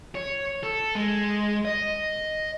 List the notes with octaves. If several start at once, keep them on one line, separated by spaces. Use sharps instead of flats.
C#5
A4
G#3
D#5